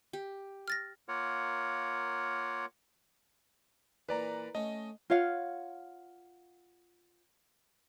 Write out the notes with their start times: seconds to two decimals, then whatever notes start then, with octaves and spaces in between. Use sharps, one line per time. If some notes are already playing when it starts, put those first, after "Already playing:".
0.13 G4
0.68 F6 A6 A#6
1.08 A#3 F4 A#4 C#5 F#5
4.09 A#2 E3 B4 D5 A#5
4.55 A3 C#4 D#5
5.10 F4 C#5 F5 F#5